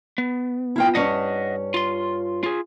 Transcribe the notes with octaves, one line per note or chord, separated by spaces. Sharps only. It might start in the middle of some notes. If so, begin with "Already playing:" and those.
B3
E4 F4 G5
G2 C#4 D#5 F#5
F4 C6
F4 G#4